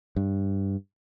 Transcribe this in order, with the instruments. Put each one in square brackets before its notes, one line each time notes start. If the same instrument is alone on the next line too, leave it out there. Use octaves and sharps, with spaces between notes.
[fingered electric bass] G2